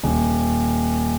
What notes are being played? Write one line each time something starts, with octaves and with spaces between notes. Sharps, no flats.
D#1